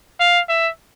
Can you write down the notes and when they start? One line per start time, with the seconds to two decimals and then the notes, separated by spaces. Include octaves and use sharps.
0.20 F5
0.49 E5